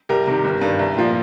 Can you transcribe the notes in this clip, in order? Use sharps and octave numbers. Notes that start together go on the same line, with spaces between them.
C2 G4 A#4
C3 D#3
G1
G2 D#3
C2
A#2 F3